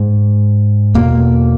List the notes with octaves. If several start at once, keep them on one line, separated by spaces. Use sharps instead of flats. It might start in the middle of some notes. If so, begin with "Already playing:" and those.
Already playing: G#2
E2 B2 A#3